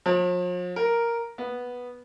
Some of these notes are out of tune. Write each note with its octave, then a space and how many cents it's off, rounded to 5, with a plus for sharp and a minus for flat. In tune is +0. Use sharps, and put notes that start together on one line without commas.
F3 +45
A#4 +0
B3 -5